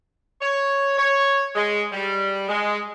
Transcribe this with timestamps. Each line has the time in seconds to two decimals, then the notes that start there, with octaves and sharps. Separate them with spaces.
0.41 C#5
0.97 C#5
1.55 G#3
1.92 G3
2.49 G#3